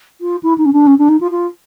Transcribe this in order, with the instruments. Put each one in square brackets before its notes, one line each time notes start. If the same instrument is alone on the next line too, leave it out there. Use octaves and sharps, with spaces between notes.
[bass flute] F4
E4
D#4
C#4
D4
C#4
D4
D#4
F4
F4